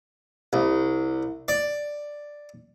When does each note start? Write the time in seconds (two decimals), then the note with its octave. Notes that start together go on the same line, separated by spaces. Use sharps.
0.53 C2
1.48 D5